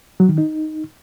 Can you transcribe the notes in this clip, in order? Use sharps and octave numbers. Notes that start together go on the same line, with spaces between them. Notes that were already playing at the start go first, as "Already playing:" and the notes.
F#3
D#3
D#4